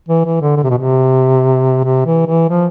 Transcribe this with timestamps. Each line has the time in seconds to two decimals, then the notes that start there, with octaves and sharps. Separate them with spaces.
0.09 E3
0.25 E3
0.41 D3
0.57 D3
0.63 C3
0.70 B2
0.77 C3
1.84 C3
2.06 E3
2.27 E3
2.49 F3